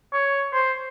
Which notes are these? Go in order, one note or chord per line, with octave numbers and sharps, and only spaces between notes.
C#5
C5